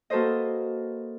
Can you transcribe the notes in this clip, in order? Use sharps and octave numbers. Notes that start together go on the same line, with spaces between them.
A#3 F#4 A4 B4 C5 D#5